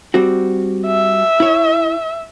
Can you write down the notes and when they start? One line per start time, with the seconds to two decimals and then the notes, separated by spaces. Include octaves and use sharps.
0.14 G3 C4 F#4
0.86 E5
1.40 E4 C#5